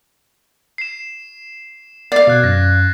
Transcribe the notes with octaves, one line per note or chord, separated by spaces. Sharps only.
C7 E7
D5 F5 A6 C7
B2 F6 F#6 G#6
F#2 A#6